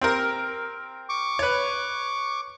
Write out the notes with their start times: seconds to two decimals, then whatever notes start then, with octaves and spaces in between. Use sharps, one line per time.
0.01 C4 G4 A#4
1.09 C#6 D6
1.39 B4 C#5